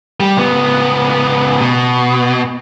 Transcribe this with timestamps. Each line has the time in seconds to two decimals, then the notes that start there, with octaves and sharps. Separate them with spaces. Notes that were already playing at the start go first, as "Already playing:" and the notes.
0.20 G3
0.37 C#2 B3
1.61 B2